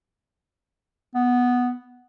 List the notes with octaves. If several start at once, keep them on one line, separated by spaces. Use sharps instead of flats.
B3